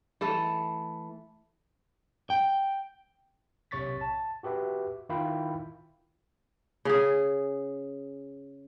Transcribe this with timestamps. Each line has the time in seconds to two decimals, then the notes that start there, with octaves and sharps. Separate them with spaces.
0.21 E3 A3 A4
2.30 G5
3.71 B1 C3 C#5 C#6 A6 B6
4.01 A5
4.43 F#4 G4 B4 E5
5.09 D#3 E4 F4 F5 G5 B5
6.85 C#3 G#4